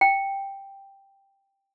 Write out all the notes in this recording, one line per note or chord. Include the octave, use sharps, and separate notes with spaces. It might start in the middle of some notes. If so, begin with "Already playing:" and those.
G5